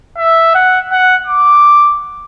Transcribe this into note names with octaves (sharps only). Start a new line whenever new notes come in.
E5
F#5
F#5
D6